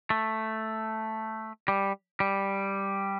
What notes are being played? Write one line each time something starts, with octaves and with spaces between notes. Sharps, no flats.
A3
G3
G3